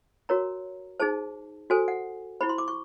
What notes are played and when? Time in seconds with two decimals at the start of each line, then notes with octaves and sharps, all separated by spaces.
0.29 F#4 A#4 C#5 A#5
1.00 D#4 G#4 C5 A5
1.70 F#4 A4 C5 G#5
1.88 F#5
2.41 E4 G4 C5 B5
2.49 C6
2.58 D6
2.68 C#6